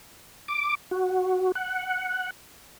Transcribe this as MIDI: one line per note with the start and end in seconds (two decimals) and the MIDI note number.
0.48 0.75 86
0.91 1.52 66
1.55 2.30 78